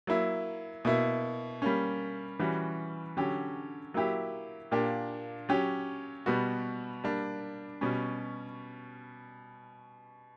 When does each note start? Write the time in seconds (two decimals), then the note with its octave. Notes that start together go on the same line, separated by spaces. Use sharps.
0.07 F#3 A#3 E4
0.85 B2 A#3 E4
1.62 G3 A#3 C#4
2.39 E3 G3 C#4 F#4
3.17 D3 F#3 C#4 G4
3.94 F#3 A#3 E4 G4
4.72 A#2 A#3 D4 G4
5.49 F#3 C#4 G4
6.26 B2 G3 B3 F#4
7.04 G3 A#3 D4
7.81 B2 G3 C#4